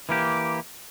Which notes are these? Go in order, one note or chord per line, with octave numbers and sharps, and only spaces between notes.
E3 A#3 G4